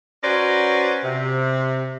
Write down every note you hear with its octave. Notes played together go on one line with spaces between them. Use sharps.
C#4 F#4 B4 C5 D5 A#5
C3